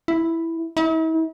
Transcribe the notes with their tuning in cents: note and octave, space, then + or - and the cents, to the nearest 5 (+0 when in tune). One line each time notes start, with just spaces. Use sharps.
E4 +0
E4 -45